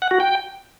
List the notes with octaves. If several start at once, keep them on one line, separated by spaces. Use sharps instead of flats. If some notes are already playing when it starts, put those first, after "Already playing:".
F#5
F#4
G5